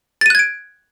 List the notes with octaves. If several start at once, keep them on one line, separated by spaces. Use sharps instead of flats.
F#6 G#6 A6 D7 D#7